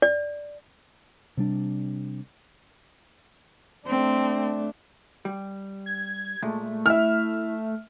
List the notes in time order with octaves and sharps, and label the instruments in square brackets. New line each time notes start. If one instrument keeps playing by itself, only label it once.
[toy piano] D5
[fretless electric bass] C3 G3 D4
[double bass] A3 D4 [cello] C4
[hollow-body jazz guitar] G3
[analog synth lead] G#6
[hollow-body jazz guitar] A#2 G#3 [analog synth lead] A3
[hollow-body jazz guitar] E4 [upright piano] E5 F6